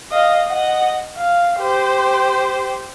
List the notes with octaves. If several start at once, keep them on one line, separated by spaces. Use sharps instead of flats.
D#5 F5
D#5 F#5
F5
G4 C5